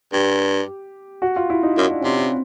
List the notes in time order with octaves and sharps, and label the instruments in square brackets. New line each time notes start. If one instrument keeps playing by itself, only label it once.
[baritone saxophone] G2 [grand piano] G4
[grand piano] F#4
F4
E4
D#4
[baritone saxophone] F#2 [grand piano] D#4
[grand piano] D4
C#4
[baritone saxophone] C3 [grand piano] D4
[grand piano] C4